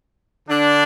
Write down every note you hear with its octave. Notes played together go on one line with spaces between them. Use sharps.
D3 D4